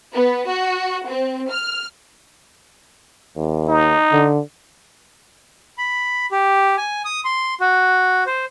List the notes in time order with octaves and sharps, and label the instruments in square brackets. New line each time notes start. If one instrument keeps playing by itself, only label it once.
[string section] B3
F#4
C4
F6
[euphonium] D#2
[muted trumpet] D#4
[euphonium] D3
[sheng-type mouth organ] B5
G4
G#5
D#6
C6
F#4
C5